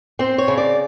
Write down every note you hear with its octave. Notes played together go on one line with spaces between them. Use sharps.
C4 C5
C#5
C#3
D5